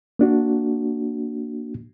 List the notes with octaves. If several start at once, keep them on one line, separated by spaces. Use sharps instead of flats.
A#3 D4 F#4